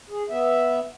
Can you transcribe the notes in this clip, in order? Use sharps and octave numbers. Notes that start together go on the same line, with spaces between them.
G#4
B3 E5